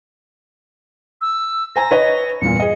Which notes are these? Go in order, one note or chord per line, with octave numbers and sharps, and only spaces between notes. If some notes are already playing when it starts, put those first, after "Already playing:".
E6
C5 G#5 A#5 A#6
B4 C#5 D#5
E2 G2 A#2 C#7
G#4 D#5